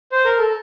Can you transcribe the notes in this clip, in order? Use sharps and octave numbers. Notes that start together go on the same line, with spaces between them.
C5
A#4
A4